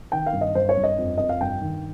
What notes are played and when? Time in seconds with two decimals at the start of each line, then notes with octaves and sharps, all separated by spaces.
0.12 D#3 G5
0.26 F5
0.33 G2
0.41 D#5
0.55 G2 C5
0.69 C#5
0.77 G2
0.83 D#5
0.98 F2
1.17 F2 D#5
1.29 F5
1.41 G2 G5
1.62 D#3